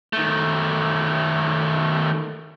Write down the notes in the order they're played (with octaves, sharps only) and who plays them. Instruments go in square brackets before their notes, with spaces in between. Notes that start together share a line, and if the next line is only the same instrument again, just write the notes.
[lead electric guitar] D#3 A3